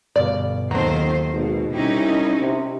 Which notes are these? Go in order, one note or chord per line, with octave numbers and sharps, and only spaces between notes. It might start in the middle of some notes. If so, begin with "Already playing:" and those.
G1 B2 D5 F5
D#2 D#3 F#3 B3 C4 F4 A4 C5
G#1 B2
C2 C#4 D#4 E4 G4
C3